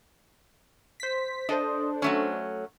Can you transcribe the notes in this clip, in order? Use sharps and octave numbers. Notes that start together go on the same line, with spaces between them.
C5 B6
D4 A4 C5 D#5
F#3 A3 C#4